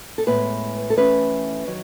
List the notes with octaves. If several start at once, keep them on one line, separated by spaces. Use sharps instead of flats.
A4
A2 G#3 B3 B4
A4
E3 A3 C#4 B4
D#3 F#3